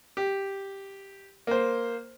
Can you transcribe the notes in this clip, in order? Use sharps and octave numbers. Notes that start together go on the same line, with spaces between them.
G4
A#3 C5